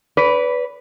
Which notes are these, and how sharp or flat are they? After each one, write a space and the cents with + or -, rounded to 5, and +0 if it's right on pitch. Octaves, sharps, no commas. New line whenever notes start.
B4 +0 D5 -35